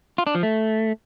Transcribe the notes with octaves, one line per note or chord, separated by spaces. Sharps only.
F4
D4
F3
A3